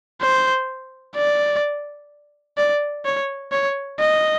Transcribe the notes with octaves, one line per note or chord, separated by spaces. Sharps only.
C5
D5
D5
C#5
C#5
D#5